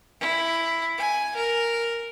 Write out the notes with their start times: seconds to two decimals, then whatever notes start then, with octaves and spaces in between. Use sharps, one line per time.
0.20 E4
0.97 G#5
1.36 A#4